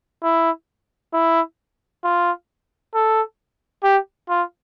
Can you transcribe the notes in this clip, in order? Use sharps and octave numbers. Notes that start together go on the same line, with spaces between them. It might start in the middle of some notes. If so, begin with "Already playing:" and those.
E4
E4
F4
A4
G4
F4